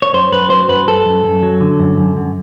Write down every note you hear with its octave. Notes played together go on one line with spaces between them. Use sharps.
C#5
F#2 C5
F#2 B4
F#3 C5
F#2 B4
F#2 A4
F#2
F#2
F#3
D3
F#2
F#2
F#2